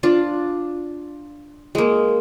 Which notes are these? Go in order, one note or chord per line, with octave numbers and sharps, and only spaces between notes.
D4 F4
G#3 A#3